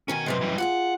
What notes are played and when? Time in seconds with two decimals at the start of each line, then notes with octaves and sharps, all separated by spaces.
0.08 B2 D#3 C#4 A#4 G#5
0.26 F#2 C3 B4 D#5
0.41 E3 G3
0.58 F4 F#4 G#4 F#5